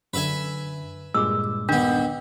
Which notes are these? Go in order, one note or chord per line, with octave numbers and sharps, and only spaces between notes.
F#2 D3 B4 E5 G#5
G2 A#2 G#3 D6 E6
D#2 B3 D4